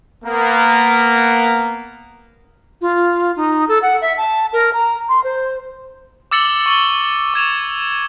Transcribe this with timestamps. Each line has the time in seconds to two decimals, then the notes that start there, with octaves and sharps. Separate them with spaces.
0.25 A#3 B3
2.81 F4
3.36 D#4
3.68 A4
3.82 F#5
4.01 E5
4.17 A5
4.53 A#4
4.73 A#5
5.09 C6
5.24 C5
6.31 D6 E6 A6 C#7 F#7 G7
6.66 C#6 F#7 G7
7.34 C#6 G#6 E7 F7